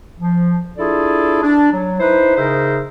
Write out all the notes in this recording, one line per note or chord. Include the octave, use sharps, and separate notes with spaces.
F3
D4 E4 F4 G#4 A4 D5
D4
F#3
D#4 E4 B4 C5
C#3 D#4 G#4 A#4 C5 E5